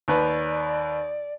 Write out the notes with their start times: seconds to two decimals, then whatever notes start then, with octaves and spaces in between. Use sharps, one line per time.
0.08 D#2 B4 D5